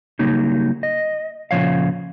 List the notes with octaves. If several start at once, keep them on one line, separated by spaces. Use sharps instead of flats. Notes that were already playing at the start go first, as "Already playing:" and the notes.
C#3 F#3 G3 A#3 D#4
D#5
A#2 C#3 F3 C#5 F5